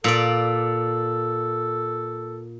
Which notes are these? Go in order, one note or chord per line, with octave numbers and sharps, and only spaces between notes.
A#2 A4 D5